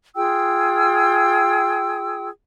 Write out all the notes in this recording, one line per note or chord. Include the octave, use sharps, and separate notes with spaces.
F4 G#4 G5 E6